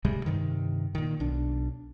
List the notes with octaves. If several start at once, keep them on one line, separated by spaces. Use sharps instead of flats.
D2 C3 G3 G#3
G2 C3 D#3
A#2 D#3
B1 D4